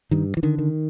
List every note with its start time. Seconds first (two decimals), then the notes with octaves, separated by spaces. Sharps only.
0.11 G2 D#3
0.37 E3
0.43 D3 D#3
0.58 D#3